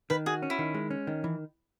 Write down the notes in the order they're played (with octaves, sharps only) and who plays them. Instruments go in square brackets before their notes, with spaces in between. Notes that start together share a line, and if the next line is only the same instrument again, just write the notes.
[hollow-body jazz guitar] D#3 [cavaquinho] B4
[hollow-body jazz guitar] F#4 [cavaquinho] G#4
[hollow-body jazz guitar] C#4
[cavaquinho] E4
[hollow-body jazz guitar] D#3
G#3
C#4
D#3
E3